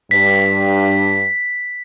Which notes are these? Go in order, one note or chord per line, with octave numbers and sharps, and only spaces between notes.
G2 B6